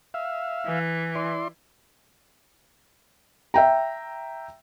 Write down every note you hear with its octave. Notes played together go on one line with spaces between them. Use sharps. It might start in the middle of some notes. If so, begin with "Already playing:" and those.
E5 F5
E3
E4 D5 C6
E5 G5 A#5